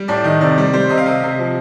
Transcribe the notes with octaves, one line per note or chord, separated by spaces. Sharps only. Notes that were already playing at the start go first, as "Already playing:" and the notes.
Already playing: G3
A2 D5
D#3 D#5
C3 D5
G3 D5
G3 C5
C3 D#5
F5
C3 D#5
C3
F3